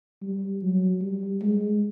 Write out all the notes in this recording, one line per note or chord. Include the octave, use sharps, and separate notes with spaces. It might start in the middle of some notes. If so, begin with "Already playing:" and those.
G3
F#3
G3
G#3